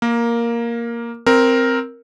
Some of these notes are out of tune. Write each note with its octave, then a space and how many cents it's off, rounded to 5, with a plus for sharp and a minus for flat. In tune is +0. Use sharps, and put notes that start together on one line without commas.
A#3 +5 A#4 +0
C4 +0 A#4 +0